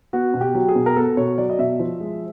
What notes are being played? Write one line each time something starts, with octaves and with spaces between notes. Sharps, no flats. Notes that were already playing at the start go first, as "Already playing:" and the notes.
B3 F#4
B2
G4
F#3
G#4
B2
A#4
B3 A4
B2 C#5
F#3 D5
D#5
B2 E5
F3
G#3